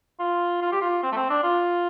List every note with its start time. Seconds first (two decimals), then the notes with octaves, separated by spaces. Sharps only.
0.19 F4
0.62 F4
0.72 G4
0.81 F4
1.03 C4
1.12 A3
1.17 C4
1.30 D4
1.44 F4